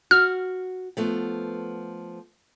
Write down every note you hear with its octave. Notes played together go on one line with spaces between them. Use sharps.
F#4 F6
F3 A3 B3